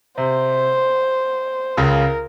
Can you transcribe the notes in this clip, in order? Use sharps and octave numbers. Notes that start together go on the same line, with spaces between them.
C3 C5
C#2 C#3 A#4